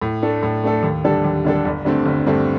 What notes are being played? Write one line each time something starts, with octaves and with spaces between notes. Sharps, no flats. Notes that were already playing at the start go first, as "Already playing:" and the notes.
A2
A3 D4 A4
A2
A3 D4 A4
D#2
D3 G3 D4 A4
D#2
D3 G3 D4 A4
G1
G2 D3 A3 C4
G1
G2 D3 A3 C4